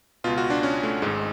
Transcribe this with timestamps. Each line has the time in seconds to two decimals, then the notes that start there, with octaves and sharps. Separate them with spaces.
0.24 C#2 B2 F4
0.38 F#4
0.50 D4
0.63 C#4
0.83 A3
1.02 G#1 G#2 G#3